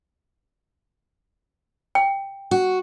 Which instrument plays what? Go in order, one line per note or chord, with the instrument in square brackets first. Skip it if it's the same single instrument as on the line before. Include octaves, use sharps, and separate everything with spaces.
[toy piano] G5
[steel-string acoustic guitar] F#4